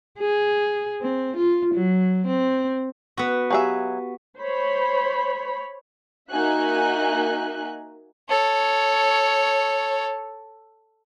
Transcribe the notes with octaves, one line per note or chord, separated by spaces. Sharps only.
G#4
C4
F4
F#3
C4
B3 F#4
F#3 G4 G#4 E5 F5 G#5
C5 C#5 B5
A#3 D#4 F#4 E5 G#5 F#6
A4 C#5